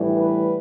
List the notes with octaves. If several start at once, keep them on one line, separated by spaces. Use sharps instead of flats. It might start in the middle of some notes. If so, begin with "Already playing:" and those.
Already playing: A2 E3 G3 D4
B4